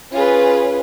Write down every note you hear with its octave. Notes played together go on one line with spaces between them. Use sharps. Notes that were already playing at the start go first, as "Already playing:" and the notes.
C#4 F4 G#4 B4